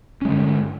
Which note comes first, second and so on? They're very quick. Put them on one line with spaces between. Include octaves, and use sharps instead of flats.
C#4 G#3 D3 G2